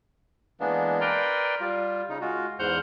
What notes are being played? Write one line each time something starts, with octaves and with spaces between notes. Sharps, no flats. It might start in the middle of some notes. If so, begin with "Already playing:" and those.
E3 G#3 A#3 B3 D4
A#4 B4 D5 G5 A#5 C6
G3 F4
C#3 D#4
G#3 F4 F#4
E2 G#2 C5 F#5 F6 G6